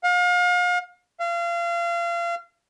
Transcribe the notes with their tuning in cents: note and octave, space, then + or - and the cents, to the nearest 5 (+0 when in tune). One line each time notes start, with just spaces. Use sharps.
F5 +40
F5 -30